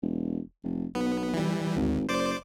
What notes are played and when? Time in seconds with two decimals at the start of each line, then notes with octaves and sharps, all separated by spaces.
0.02 E1
0.64 F1
0.95 B1 B3
1.34 E3 G3
1.76 G#1 D2
2.09 F#1 C5 D5 D6